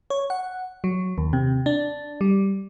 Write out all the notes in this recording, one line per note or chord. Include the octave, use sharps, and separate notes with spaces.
C#5
F#5
F#3
D#2
C3
D4
G3